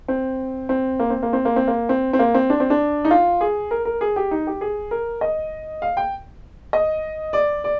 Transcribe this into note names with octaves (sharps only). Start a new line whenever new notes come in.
C4
C4
A#3
C4
A#3
C4
A#3
C4
A#3
C4
C4
A#3
C4
D4
C4
D4
D#4
F4
G#4
A#4
A#4
G#4
G4
D#4
G4
G#4
A#4
D#5
F5
G5
D#5
D5
D5